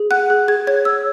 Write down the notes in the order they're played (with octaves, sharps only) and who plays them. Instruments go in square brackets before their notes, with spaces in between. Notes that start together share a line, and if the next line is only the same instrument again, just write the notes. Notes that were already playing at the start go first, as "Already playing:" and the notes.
Already playing: [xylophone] G#4
F#5 F#6
G#4
G#4 G#6
C#5 G#6
C#5 E6